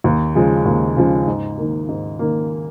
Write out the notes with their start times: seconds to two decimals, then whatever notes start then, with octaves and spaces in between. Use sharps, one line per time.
0.04 D#2
0.35 C#3 F3 G#3
0.66 D#2
0.96 C#3 F3 G#3
1.27 G#2
1.58 D#3 A#3
1.89 G#2
2.19 D#3 A#3